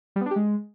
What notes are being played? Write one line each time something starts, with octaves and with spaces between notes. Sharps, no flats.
G3
B3
D4
G4
G#3